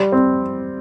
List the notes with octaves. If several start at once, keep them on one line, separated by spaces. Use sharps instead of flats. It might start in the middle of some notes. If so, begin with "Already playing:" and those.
Already playing: G3
C4